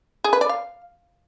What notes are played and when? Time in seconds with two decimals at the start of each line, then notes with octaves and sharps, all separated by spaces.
0.24 G#4
0.33 B4
0.41 D5
0.49 F5